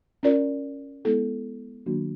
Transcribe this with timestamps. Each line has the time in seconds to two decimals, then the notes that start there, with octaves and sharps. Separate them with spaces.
0.23 C#4 F4 A#4 D5
1.05 G#3 B3 E4 A4
1.86 D#3 F#3 A#3 D4 F#4